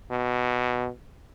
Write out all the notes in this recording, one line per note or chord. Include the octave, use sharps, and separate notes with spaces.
B2